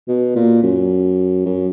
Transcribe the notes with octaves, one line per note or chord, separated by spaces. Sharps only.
B2
A#2
F#2
F#2